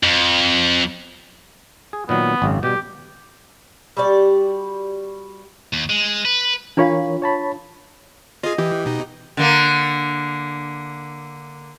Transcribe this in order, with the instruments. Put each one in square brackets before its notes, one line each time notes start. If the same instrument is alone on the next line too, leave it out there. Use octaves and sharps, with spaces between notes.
[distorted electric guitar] F2
[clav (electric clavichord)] G#4
[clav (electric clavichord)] A#2 D#3 F#3 [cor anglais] B3
[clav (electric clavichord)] G#1 F#2 C#3
[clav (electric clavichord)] B2 G3 [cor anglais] G4
[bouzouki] G3 F#4 G4 D5
[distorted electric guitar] D#2
G#3
B4
[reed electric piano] E3 A#4 C#5 [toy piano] D4 F4 F5
[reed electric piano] C#5 A5 B5
[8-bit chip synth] F4 G#4 [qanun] D#5
[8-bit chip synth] E3 [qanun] G4
[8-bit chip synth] B2 D#4
[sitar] D3 A#3